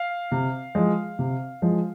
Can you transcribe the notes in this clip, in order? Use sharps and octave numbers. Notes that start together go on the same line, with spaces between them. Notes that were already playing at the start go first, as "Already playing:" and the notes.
Already playing: F5
C3
F3 G#3
C3
F3 G#3